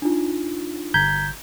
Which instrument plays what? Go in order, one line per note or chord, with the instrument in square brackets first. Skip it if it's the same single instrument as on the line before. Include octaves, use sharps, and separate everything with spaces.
[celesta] D4 D#4 F4
[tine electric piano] G1 G6 [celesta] A#5 G#6 B6